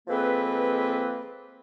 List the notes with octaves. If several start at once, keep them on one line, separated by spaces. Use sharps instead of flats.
F3 G#3 A#3 C4 A4 B4